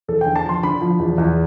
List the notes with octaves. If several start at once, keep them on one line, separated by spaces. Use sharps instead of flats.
E2 A4
G5
D3
A5
F3 C6
D3 B5
F3
E2
E2